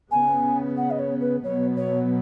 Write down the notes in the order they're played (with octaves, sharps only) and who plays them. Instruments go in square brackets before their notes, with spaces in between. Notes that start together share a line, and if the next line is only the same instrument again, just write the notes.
[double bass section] C#3 B3 [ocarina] G#5
[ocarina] F#5
D#5
C#5
B4
[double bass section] B2 F#3 B3 [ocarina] C#5
[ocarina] C#5